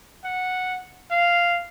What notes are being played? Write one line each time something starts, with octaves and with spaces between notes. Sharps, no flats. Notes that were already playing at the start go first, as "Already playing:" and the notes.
F#5
F5